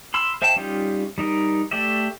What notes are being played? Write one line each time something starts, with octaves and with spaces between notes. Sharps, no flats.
B5 C6 E6 F6
C5 E5 F5 G5 A5
G3 C#4 D#4 F4 G4
G3 D#4 A#4
A3 G4 D5 E5